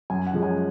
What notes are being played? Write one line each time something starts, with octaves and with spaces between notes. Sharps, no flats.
F#2 G#5
F#5
F3 G#3 C#4
G#5